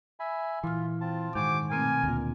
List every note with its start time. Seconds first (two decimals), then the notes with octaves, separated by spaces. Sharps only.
0.20 E5 G#5 B5
0.64 A#2 E3 F4 F6
1.01 C4 F4 A5
1.35 G#2 D#3 F#4 C5 G#5 D6
1.71 B2 A3 C4 A#4 G#5
2.03 D2 A#2